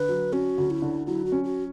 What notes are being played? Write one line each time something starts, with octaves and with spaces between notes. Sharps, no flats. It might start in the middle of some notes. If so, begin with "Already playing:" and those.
Already playing: D3 B4
F#3
C#4 F#4
D2
E4
D3
F#3 E4
F#4
C#4
F#4